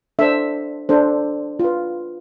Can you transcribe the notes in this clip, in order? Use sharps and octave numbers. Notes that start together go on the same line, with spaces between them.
D4 A4 C5 E5
D4 A4 C5
F4 B4